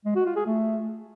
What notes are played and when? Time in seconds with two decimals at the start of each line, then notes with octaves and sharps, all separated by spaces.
0.05 G#3
0.16 F#4
0.26 F4
0.36 G#4
0.46 A3